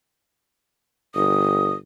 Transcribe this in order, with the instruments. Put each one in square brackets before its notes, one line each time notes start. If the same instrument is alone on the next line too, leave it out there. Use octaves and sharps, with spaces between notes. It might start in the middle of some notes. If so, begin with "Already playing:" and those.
[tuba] G1 [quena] D#6